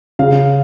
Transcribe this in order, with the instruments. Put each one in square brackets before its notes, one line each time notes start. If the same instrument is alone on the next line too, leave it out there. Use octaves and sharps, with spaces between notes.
[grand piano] C#3 F5